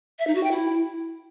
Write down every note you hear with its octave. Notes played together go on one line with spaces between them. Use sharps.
E5
D#4
F#4
G5
E4